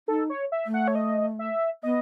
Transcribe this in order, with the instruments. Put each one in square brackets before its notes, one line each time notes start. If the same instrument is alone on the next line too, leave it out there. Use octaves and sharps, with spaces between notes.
[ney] D#4 [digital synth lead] A4
[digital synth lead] C#5
E5
[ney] A3
[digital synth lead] F#5
C#5
D#5
E5
[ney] B3 [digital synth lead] D#5